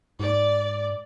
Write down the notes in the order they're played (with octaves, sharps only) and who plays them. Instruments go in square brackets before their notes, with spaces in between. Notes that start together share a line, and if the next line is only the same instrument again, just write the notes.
[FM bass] G#2 [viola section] D5